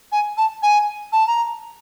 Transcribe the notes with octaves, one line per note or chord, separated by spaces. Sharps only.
G#5
A5
G#5
A5
A#5